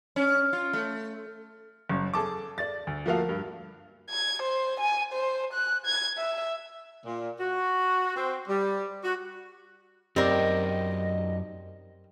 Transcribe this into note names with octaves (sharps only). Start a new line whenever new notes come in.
C#4
F4
A3
F#1 F#2
G#4 A4 A5 D6
D5 A6
D2
F3 A3 A#3 F#4 A4 F5
G2
G#6
C5
G#5
C5
F#6
G#6
E5
A#2
F#4
C4
G3
F#4
F#2 C4 D#4 G4 A#4 D5 D#5